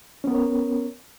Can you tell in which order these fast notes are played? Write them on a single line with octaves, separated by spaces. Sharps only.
C#4 B3 A#4 C#5